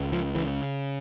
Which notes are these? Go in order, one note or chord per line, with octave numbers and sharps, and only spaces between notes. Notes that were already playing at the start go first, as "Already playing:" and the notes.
Already playing: C#2
F3
C#3 E3